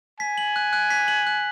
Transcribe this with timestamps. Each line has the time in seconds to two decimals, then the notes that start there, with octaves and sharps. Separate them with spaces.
0.20 G#5 B6
0.38 F#7
0.56 F#6
0.73 F#6
0.90 B6
1.08 F#7
1.27 F#6